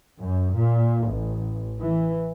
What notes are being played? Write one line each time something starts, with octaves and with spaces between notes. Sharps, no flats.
F#2
A#2
A1
E3